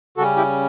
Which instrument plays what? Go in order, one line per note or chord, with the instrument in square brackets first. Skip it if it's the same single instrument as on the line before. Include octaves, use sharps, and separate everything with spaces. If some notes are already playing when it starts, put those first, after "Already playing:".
[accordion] C#3 G3 C#4 F#4 A4
E4 G4